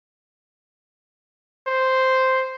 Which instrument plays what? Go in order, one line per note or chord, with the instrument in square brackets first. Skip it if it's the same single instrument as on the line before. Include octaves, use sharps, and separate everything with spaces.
[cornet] C5